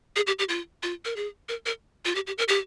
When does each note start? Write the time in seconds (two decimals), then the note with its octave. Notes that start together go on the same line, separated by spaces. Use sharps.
0.16 G#4
0.27 G4
0.39 G4
0.49 F4
0.83 F4
1.05 A#4
1.16 G#4
1.49 A#4
1.66 A#4
2.05 F4
2.15 G4
2.27 G4
2.38 A#4
2.48 G4